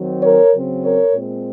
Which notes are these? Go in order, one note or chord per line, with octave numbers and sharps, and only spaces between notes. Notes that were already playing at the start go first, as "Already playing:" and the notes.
Already playing: D#3 F#3 C4
A#4 C#5
C#3 F#3 C4
A#4 C#5
A#2 G#3 C4